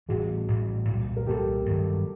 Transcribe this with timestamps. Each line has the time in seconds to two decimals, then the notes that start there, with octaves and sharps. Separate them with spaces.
0.09 A1 A2 E3 G3 F#4 G#4
0.48 A1 A2 E3 G3
0.88 C2 A#2 G3
1.17 A#4
1.26 C2 A#2 G3 G4 A4
1.66 G2 D#3 F#3